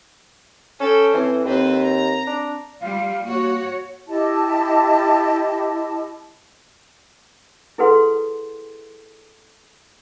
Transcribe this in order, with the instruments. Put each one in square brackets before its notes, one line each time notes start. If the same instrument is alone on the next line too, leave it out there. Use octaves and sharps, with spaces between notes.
[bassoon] C#4 [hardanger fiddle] A4 G5
[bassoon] E3 [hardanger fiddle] C4
[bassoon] D#2 [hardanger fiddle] C4 B4
[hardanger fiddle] A#5
[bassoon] D4
[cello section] G3 F4 [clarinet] F5
[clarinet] A#3 [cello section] F#4 C#5
[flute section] E4 G4 D#5 A5
[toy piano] E4 G#4 A4 B4 F#5 C6